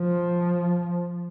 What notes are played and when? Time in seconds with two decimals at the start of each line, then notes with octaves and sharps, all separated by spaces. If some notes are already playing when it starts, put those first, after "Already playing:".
Already playing: F3